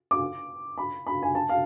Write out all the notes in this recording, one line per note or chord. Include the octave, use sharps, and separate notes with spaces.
D6
B5
B5
G#5
A5
F5